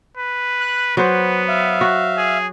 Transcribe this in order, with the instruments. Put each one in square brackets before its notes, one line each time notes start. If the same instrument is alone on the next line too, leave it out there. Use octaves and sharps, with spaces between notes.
[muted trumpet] B4
[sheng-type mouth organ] F#6
[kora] F#3 C5 [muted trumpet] B3 [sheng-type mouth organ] B4
[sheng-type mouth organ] E5 F5
[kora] F#4
[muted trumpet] G#4